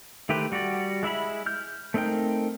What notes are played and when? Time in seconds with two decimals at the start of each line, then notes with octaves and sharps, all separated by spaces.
0.29 D#3 A3 G4 B4 C5
0.52 G3 F#4 G4 D5
1.03 G#3 E4 E5 B5
1.46 F6 G6
1.94 A3 C4 D#4 A#4 G5